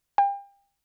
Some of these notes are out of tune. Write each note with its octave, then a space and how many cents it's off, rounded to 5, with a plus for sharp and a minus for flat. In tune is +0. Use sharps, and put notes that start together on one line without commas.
G5 +35